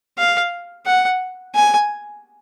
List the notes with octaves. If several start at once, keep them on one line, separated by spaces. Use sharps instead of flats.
F5
F#5
G#5